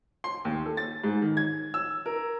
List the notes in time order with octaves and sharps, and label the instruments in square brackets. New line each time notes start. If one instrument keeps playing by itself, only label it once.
[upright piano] C6
D#2
A4
A6
G#2
D#3
G#6
E6
A#4